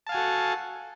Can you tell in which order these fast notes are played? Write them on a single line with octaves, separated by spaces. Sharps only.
A5 F5 G#5 F#4 A4